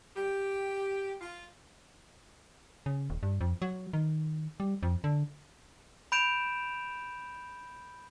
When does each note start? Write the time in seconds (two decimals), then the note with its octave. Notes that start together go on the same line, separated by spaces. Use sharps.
0.16 G4
1.20 F4
2.86 C#3
3.10 D#1
3.23 G2
3.41 F2
3.62 F#3
3.93 D#3
4.60 G3
4.83 F2
5.04 D3
6.12 B5 G6 D7 E7 F7